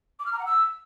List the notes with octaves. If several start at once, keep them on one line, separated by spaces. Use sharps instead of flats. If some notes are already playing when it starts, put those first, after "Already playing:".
D6
F6
A#5
F#5
E6